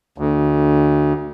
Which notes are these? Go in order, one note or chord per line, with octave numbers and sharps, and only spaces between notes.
D2